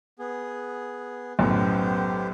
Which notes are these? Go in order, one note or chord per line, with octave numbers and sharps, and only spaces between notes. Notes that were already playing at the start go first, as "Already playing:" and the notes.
B3 G#4
B1 F#2 A2 B3 G4 C5